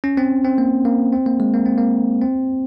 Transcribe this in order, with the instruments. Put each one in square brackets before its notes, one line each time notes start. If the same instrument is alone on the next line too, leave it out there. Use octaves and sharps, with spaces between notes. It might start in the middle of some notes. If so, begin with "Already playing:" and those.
[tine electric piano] C#4
C4
C4
A#3
A#3
C4
A#3
G#3
A#3
C4
A#3
C4